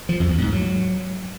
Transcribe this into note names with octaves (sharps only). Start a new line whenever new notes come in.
F3
F2
E2
G#2
F#3